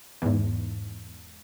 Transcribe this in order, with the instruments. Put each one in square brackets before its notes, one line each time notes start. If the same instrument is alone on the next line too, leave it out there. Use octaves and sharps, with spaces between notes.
[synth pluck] E2 G#2